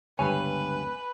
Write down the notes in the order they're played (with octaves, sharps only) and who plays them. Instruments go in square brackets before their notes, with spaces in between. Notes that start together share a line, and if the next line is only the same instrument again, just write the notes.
[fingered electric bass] C#2 D3 B3 [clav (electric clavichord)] G2 C#5 [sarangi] B4 [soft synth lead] G#5